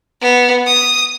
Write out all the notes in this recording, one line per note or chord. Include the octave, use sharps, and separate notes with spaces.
B3
D#6